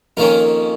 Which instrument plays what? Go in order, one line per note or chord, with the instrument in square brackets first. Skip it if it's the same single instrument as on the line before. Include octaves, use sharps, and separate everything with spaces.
[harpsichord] F2 D#3 A#3 C#4 A#4